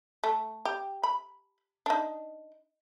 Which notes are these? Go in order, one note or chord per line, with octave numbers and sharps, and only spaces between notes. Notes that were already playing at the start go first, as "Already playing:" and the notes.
A3
G4
B5
D4 D#4